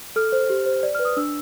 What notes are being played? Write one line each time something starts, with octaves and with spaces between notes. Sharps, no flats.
A4 F6
C5
G4
C5
D5
F6
B4
D#6
D4 E6